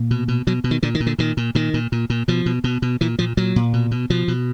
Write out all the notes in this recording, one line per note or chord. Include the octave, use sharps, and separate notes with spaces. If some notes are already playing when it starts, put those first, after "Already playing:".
Already playing: A#2
B2
B2
B2 F#3
B2
D#3
A#2 D3
D#3
A#2
D3
A#2 D#3
A#2
A#2 D#3
A#2
A#2
A#2
B2 F3
B2
B2
B2
A#2 E3
A#2 F3
A#2 F#3
A#2
B2
B2
B2 F3
B2